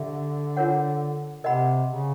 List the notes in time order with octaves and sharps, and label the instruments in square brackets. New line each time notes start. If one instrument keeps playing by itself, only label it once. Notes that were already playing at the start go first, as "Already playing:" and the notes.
Already playing: [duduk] D3 [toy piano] G4 E5
[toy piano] D4 F4 A#4 C#5 F#5
[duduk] C3 [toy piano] A#4 D#5 F#5 B5
[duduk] C#3